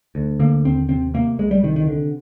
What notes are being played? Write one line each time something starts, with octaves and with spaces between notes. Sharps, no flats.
D2
D3 A#3
D#2 C4
C3 C4
C3 A#3
C2 G#3
G3
C3 D#3
D#3
D3